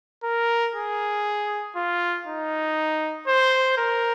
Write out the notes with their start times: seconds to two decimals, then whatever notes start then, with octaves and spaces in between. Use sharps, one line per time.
0.23 A#4
0.75 G#4
1.76 F4
2.27 D#4
3.27 C5
3.78 A#4